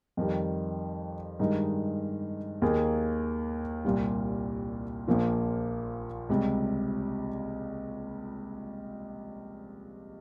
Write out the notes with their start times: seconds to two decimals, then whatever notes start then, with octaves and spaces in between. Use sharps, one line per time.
0.17 F2 D#3 G3
1.39 G2 D#3 G#3 D#4
2.62 D#2 D#3 A#3 D#4 G#4
3.85 C2 A#2 G3
5.08 A#1 A#2 F3 A#3 F4
6.29 C#2 C3 G3